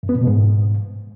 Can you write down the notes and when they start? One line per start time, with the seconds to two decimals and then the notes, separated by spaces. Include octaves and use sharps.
0.03 F#2
0.09 B3
0.15 A#2
0.21 B2
0.27 G#2